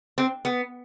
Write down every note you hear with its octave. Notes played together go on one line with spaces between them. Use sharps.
C4
B3